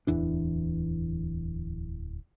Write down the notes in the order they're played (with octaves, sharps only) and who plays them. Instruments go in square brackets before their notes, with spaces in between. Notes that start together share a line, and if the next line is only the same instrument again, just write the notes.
[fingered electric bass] D1 E2 E3 D4